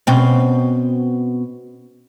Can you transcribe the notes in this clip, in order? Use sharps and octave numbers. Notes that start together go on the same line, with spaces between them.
B2 C4 C#4